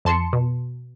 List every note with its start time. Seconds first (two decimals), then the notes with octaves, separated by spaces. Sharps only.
0.05 F2 A5 C6 C#7
0.33 B2